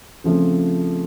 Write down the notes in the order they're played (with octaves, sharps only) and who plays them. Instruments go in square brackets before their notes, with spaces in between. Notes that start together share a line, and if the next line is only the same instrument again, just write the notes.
[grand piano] C#3 F3 A3 C4 F4